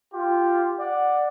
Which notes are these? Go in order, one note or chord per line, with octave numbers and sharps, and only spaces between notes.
F4 G4
D5 F#5